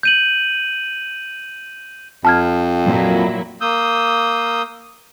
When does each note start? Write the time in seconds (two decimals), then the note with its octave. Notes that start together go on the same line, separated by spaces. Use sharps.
0.03 G6 D#7 F#7
2.25 F2 A5 F6 G#6
2.86 A#2 F#3 E4
3.61 A#3 D#6 E6 G6